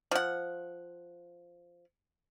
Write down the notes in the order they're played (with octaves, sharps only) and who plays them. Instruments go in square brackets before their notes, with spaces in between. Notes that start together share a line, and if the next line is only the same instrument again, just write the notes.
[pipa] F3 F#5